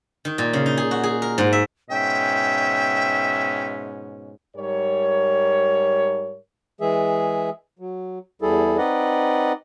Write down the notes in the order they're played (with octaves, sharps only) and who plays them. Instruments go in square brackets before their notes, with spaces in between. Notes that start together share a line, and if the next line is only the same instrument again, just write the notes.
[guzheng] D#3
A#2
C#3
D#4
G#4
F#4
G#4
A#4
G#2
E5
[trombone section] G#2 B2 C#4 [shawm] E5 [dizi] G5
[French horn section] G#2 G3 A#4 C#5
[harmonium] E3 G#3 G#4 E5
F#3
E2 G3 E4 G#4 A4
C4 D#4 B4 D5 D#5 F#5